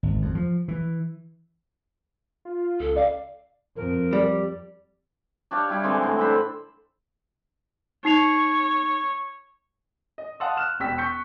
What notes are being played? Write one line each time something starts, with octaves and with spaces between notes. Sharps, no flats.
G#1
F2
F3
E3
F4
C#2 A4
D5 F5
F2 A#4
G3
D4 G4 C#5 F5
G3 E4 G4
D3 E3 G#3 C4
A2
D4 C5 B5
D#4 C#5 C7 F7
D#5
F5 F#5 A5 C6 D#6 E6
F6 F#6 E7
E1 G5 E6 B6
C#6 G6 B6 C#7